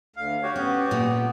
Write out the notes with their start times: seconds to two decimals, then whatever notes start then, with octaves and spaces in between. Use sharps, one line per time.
0.16 D2 F5
0.43 F#4 G4 C#5
0.56 B3 C#4
0.91 A#2 A3